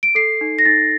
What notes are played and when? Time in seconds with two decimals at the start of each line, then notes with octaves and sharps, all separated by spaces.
0.03 D7
0.15 A4 C7
0.41 D#4
0.59 A#6
0.65 D#4 A6